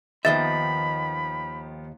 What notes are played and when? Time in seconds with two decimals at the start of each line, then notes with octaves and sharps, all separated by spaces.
0.25 D#2 D#3 F3 B3 D#5 E5 B5 A6